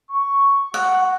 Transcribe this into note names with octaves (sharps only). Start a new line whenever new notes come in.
C#6
F#4 F#5